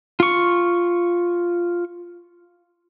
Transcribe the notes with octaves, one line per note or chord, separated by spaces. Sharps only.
F4 C#6